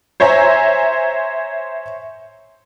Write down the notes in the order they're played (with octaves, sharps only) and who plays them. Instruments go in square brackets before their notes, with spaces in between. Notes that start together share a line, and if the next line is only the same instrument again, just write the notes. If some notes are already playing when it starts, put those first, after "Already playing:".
[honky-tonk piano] C5 C#5 E5 G#5 A#5